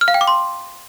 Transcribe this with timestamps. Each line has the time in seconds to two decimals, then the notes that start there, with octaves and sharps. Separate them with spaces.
0.01 F6
0.08 F5
0.14 G5
0.21 D6
0.28 C6